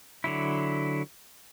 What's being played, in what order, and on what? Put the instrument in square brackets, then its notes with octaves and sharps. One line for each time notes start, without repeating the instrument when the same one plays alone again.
[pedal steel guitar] D3 F#3 E4